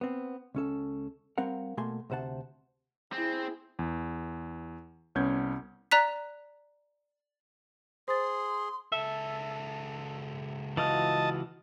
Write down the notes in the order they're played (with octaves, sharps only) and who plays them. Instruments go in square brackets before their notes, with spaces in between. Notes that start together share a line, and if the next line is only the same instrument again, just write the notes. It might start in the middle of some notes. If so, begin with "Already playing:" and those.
[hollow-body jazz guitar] B3 C4
C#2 C#4 A4
G3 C4 A#4 F5 F#5
B2 A3 A#3 G#5 C6
D2 C3 C5 F#5 A5
[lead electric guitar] C4 [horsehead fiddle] E4 G#4
[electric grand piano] E2
C2 B3 C#4 G6 G#6
[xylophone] D5 A#5 F#6 B6
[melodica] G#4 [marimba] C5 A6 [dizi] C6
[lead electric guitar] C#2 A4 [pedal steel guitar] E5
[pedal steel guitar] E3 F4 F#4 [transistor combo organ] D#5 A5